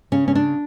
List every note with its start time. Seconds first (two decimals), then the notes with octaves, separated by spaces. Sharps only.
0.12 C#3 C#4
0.28 C#4
0.35 D4